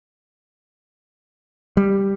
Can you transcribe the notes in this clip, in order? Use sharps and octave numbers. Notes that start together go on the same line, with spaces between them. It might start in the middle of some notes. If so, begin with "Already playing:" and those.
G3